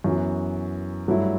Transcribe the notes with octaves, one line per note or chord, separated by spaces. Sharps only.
F#2 E3 B3 F#4
G2 F#3 A3 E4